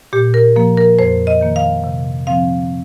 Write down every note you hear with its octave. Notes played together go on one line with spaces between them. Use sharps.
A#2 G4
A#4
F3 A#3
A#4
F2 C5
D#5
D#3 A#3
F5
C3
F3 C4 F5